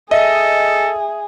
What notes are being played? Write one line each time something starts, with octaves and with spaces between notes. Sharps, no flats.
G#4 A4 D#5 E5